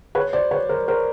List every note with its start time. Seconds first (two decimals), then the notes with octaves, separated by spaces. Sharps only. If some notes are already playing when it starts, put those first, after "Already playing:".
0.15 B4 C#5
0.33 C5 D5
0.51 B4 C#5
0.69 A#4 C5
0.88 A#4 C5